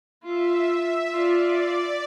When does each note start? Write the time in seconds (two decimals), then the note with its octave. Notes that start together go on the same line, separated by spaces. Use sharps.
0.24 F4 E5
0.68 E5
1.11 F4 D5